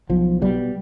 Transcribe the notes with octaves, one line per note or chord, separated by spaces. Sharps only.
B1 F3
B2 G3